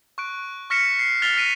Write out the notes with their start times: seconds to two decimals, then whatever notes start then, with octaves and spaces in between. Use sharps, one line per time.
0.18 C#6 F#6 D7
0.70 C#6 F6 A#6 B6 C#7 E7
0.99 C7
1.22 F6 A6 B6 F7 G7
1.36 F6 A#6 B6 D7 D#7